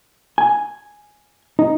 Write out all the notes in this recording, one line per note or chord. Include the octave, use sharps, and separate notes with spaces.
G#5
D#4